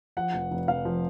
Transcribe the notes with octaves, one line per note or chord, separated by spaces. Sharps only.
F3 F#5
F1
F1
F1 F5
F3